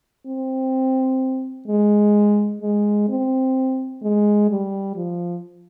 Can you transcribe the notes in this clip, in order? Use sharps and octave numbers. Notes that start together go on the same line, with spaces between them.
C4
G#3
G#3
C4
G#3
G3
F3